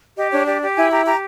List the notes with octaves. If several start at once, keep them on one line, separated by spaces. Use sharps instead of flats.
G4 D#5
D4 C#5
G4 D5
G4
E4 G#5
G4 A#5
G4 A#5